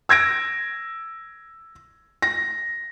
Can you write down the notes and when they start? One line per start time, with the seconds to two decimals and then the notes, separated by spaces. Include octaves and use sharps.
0.09 E6 G#6 A#6 D7
2.22 A#6